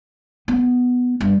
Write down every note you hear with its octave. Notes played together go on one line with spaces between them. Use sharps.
B3
G2